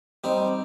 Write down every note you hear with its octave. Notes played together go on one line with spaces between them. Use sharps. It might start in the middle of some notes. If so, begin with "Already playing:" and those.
G3 C4 D#4